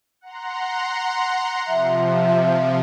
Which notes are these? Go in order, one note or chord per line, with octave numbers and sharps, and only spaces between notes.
F#5 A#5 C6
C3 F3 E5